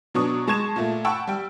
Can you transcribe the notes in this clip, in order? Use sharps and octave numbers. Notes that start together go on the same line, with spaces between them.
B2 F#3 D4 C#6 D#6
G#3 A5 C#6 G#6 E7
A#2 A3
F#5 G5 A5 B5 C#6 E6
G3 G5